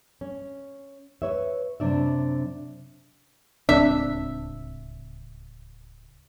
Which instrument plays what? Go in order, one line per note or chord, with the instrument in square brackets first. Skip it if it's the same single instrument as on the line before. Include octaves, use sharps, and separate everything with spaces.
[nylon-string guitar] C#4
B4 C#5 E5
F#2 C3 D4 E5
[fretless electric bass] D1 C#2 C4 [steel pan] D4 [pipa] E5